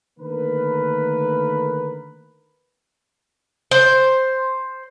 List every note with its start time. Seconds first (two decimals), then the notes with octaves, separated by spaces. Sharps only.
0.19 D3 D#3 A3 A#3 A#4 B4
3.71 C5